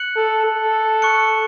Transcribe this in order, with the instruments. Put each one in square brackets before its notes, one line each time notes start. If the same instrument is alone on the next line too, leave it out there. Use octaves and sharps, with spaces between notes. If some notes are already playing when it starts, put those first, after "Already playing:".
Already playing: [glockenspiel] F#6 C#7 F#7
[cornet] A4
A4
[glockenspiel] C#6 F#6 C#7